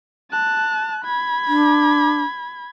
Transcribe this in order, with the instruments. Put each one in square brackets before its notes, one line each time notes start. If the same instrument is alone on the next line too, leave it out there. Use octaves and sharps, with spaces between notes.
[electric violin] A5 F#6
B5 G#6
[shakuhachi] D4